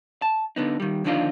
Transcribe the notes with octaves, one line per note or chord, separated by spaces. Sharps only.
A5
D3 B3 D#4
D#3 G3
D#2 D3 F3 D4 D#4 F4